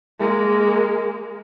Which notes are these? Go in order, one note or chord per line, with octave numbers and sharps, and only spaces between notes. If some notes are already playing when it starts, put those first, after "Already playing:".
G#3 A#3